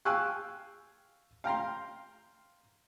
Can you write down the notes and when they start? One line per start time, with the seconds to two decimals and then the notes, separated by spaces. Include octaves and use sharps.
0.05 F5 G5 G#5 C#6 E6 F#6
1.44 F5 G5 A#5 C6